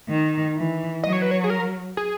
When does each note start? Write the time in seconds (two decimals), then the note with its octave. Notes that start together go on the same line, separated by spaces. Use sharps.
0.09 D#3
0.56 E3
1.04 F#3 D#5
1.13 C#5
1.22 B4
1.31 C#5
1.44 G#4
1.50 A#4
1.97 G#4